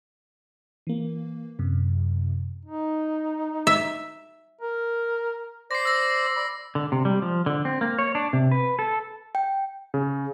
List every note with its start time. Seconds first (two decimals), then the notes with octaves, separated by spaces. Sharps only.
0.87 E3 A#3
1.59 F#2 C3
2.65 D#4
3.67 E5
4.61 A#4
5.71 C5 D5 A#6 C7
5.85 E6 A#6
6.36 D5 B5
6.75 D3
6.92 C3
7.05 G3
7.22 F3
7.46 D3
7.65 C4
7.81 A#3
7.99 C#5
8.15 D4
8.33 C3
8.52 B4
8.79 A4
9.35 G5
9.94 C#3